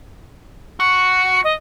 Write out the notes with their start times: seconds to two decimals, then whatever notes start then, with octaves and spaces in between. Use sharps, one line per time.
0.80 F#4 C#7
1.44 D#5